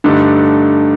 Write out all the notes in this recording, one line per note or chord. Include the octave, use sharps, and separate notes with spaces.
G2 D3 A3 D#4